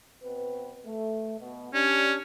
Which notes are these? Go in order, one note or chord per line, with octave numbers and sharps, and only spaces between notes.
B2 C4 B4
A3
B2
C#4 D4 G4